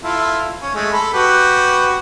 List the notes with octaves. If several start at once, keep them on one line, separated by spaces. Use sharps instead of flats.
E4 F4 A4
C#4
G#3 A3
A4 B5
F#4 G4 B4